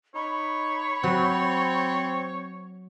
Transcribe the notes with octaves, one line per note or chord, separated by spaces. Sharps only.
D#4 C#5 B5
F#3 C4